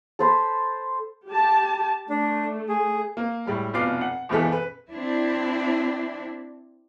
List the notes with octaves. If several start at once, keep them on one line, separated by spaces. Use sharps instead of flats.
A4 C5 B5
G4 A5
A3 D4
G#4
A#3
A2 G3 G#3
F1 B2 F4 B4 D6 C7
F#5
F#1 C#2 B2 E3 A4 B6
B4
C4 D4 E4